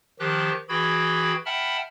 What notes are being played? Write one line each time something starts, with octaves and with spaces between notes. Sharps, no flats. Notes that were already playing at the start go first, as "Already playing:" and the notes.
D#3 F3 G4 F#6
E3 F#4 G#4 G5 B5 G#6
E5 F#5 G5 A5 B5 F6